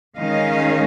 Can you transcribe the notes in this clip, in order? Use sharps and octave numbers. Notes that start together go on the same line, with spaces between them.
D#3 G#3 C#4 D#5 F5